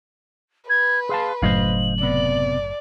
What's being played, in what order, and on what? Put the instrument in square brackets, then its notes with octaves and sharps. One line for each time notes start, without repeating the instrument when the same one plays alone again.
[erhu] B4 [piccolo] G#6
[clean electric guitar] G#4 F5 A5 [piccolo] C6
[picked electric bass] F#1 F#2 A2 [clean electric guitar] C5 D#5 F5 [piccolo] F#7
[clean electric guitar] C3 B3 [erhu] D5